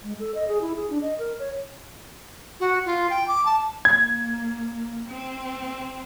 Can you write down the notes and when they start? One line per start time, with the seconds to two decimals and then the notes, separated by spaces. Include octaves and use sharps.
0.03 G#3
0.20 A4
0.35 D#5
0.48 G#4
0.62 E4
0.76 G#4
0.90 D4
1.02 D#5
1.19 A#4
1.39 C#5
2.60 F#4
2.86 F4
3.10 G5
3.28 D6
3.45 A5
3.85 A#3 G#6
5.07 C4